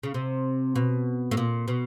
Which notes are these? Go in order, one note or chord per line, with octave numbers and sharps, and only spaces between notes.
C#3
C3
B2
A2
A#2
B2